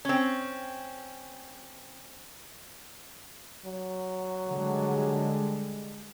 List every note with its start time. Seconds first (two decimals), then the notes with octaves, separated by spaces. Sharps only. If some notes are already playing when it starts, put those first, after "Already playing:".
0.05 C4 C#4
3.65 F#3
4.48 D3 G3 G#3